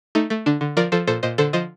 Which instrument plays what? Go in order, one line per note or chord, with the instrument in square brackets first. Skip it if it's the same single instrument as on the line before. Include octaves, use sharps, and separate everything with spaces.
[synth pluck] A3 D#4
A3
D3 D4
D3
F3 A#4 D5
F3 A4 C5
A#2 A4 C5
A#2 C5 D#5
D3 A4 C5
F3 C5 D#5